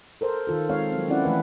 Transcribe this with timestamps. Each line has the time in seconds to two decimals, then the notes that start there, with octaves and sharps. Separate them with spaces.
0.21 A4 A#4 C5
0.47 D#3 F4 A4
0.69 G#3 C4 F4 C#5 F5
0.92 F#3 C4
1.09 C4 C#4 E4 D5 F#5
1.24 E3 A3 B4